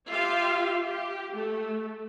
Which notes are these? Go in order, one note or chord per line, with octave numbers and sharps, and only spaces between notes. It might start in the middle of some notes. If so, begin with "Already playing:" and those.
F4 G4 E5 F5
G4
A3